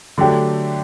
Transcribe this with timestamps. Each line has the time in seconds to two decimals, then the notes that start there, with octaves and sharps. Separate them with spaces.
0.18 D3 F#3 A3 D4 G4